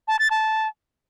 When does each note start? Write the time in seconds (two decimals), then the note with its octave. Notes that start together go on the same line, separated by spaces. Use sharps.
0.08 A5
0.19 A6
0.31 A5